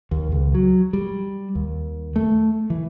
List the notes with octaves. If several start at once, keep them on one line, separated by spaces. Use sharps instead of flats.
D#2
C#2
F#3
G3
D#2
A3
E3